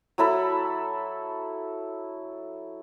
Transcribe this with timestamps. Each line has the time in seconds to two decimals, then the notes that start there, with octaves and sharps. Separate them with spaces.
0.18 F#3 E4 A4 B5